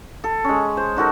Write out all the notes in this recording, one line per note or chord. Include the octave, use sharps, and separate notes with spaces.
A4
G#3 C#4
C5
D#4 F#4 A4 A#4